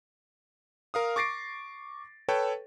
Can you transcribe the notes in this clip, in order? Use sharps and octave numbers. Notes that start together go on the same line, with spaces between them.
A#4 F5 D#6
C#6 D6 A6 A#6 C7 D7
A4 B4 C#5 G5 A5